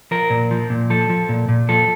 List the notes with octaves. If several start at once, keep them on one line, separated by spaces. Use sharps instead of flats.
F3 A#4
A#2
F3
A#2
F3 A4
F3
A#2
A#2
F3 A4